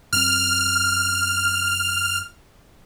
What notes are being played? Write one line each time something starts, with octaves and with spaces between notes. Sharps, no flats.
F#2 C4 F6